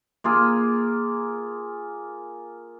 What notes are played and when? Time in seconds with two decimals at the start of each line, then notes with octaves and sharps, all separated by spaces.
0.24 A#3 F4 G#4